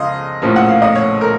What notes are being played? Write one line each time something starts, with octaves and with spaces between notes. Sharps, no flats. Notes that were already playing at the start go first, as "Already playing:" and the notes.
Already playing: C#2 C#3 F3 D#5 F5 C6
A#1 A2 F3 A#3 C#4
F#5
F5
D#5
C#5
A#4